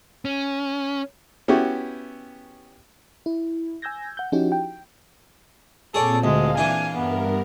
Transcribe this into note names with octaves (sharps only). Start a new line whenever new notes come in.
C#4
B3 C#4 E4 F#4 G4
E4
G#5 E6 G6 G#6 A#6
F#5 G6
F3 C#4 D#4 E4 F#4 G4
G5
A#2 C4 G#4 A4 C#5 D5
D2 G#3 F5
E3 D4 G#5
G2 B3 A#4